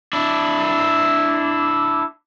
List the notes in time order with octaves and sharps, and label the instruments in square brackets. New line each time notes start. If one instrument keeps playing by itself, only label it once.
[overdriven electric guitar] D4 E4